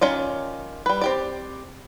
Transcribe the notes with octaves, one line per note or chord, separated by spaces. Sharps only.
D#3 C#4 F4 D5
G3 B4
C4 G4 D5